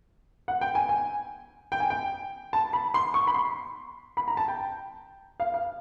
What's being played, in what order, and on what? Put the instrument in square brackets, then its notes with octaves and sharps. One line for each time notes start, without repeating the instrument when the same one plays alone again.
[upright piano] F#5
G5
G#5
G#5
G5
G#5
G5
A5
B5
C6
C#6
B5
C6
B5
A#5
A5
G5
F5
F5